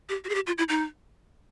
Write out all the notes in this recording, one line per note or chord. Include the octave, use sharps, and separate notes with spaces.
G4
F#4
G#4
G4
F4
E4
D#4